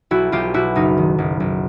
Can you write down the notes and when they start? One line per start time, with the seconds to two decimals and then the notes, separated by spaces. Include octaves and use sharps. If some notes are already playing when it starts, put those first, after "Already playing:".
0.11 B1 E4 F#4
0.32 B1 F4 G4
0.54 B2 E4 F#4
0.76 F#1 D#4
0.98 D#3
1.18 F#1
1.40 F#1